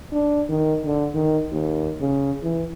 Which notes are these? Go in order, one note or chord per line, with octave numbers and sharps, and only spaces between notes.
D4
D#3
D3
D#3
D#2
C#3
E3